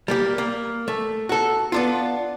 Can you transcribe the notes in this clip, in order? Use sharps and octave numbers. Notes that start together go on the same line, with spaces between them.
G3 A#3 G4
A#3
A3
F#4 A4
B3 D4 F4